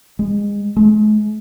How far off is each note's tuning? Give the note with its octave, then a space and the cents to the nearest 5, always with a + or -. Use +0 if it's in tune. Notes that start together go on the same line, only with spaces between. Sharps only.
G#3 -25
G#3 +45